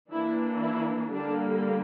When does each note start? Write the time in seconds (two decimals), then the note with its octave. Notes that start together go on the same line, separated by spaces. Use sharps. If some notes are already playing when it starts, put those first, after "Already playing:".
0.12 E3 A#3 D4 E4
0.62 E4
1.12 D3 G3 A#3 D4